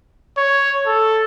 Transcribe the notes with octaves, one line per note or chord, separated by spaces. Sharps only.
C#5
A4